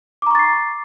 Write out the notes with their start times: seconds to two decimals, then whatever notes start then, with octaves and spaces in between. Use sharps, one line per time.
0.22 D6
0.26 A#5
0.31 C#6
0.35 A6
0.39 C7